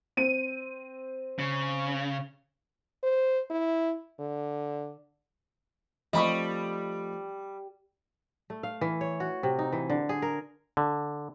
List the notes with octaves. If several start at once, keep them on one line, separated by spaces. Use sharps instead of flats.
C4 D#7
C#3
C5
E4
D3
F3 G3 A3 C4 D#5 B5 C#6
A3
F5
E3
C#5
F#4
C3
D#4
E3
D3
G#4
A#4
D3